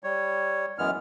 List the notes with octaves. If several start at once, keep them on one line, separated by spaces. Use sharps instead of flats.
G3 C#5
F#2 E3 G#3 B3 F6